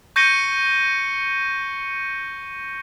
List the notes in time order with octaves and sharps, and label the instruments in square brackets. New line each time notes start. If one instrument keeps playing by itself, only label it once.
[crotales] C#6 G6 A#6 C#7 D#7 G7